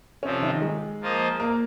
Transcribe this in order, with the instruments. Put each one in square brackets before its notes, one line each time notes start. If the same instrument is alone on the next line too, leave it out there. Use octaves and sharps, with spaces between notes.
[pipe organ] C3 F3 C4 F4 [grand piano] C#4
[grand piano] D#3 D#4
G#3 G#4
[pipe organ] F3 A#3 F4 C5 D#5
[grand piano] A#3 A#4